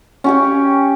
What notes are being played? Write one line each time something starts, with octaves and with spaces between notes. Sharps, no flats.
C#4 G4 G#5